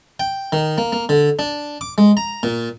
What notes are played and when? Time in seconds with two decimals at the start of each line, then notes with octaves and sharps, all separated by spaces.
0.20 G5
0.52 D#3
0.78 A#3
0.92 A#3
1.09 D3
1.39 D4
1.81 D6
1.98 G#3
2.17 A#5
2.43 A#2